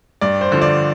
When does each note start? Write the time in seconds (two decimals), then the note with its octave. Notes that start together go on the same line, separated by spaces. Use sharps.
0.21 G2 D5
0.41 C5
0.52 D3 F3
0.62 D5